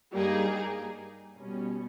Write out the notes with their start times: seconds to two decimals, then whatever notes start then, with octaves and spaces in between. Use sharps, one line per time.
0.13 G2 G3 A#3 D#4 G#4
1.39 B2 G3 C#4